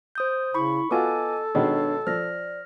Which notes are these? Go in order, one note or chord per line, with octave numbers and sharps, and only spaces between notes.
C5 D#6 G6
C#3 E4 B5 C#6
B3 F4 F#4 A4 D#5 G#5 D6
B2 D#3 G#3 D4 C#5
F3 D5 F6 A#6